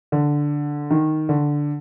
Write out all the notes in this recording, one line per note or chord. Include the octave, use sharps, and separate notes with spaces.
D3
D#3
D3